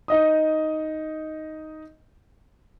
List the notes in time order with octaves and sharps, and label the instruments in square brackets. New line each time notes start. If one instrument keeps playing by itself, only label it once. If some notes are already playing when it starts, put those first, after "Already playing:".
[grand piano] D#4 D#5 D#6